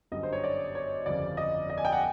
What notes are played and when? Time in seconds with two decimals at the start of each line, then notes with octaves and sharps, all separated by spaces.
0.12 G1 F#2 D3 G3 D#5
0.23 C5
0.33 C#5
0.44 D5
0.75 C#5
1.06 G1 F2 C#3 D5
1.37 D#5
1.70 D#5
1.78 G#5
1.85 G5
1.92 F#5